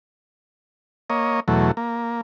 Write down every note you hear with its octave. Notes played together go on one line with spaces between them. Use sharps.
A#3 C#5 D#5
E2 B2 F#3 A3
A#3